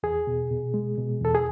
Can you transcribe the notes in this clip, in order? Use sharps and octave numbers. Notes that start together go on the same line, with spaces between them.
E2 G#4
B2
B2
G#3
B2
E2 A4
G#4